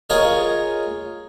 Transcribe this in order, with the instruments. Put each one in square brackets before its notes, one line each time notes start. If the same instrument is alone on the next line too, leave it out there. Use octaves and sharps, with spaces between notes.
[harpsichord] F4 G#4 A#4 C#5 D#5